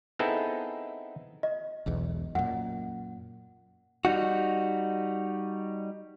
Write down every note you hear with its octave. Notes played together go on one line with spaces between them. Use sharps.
B3 C4 D#4 E4 G#4 A4
D#5
E1 B1 E2
F#2 A#2 F#5
G3 D#4 F#4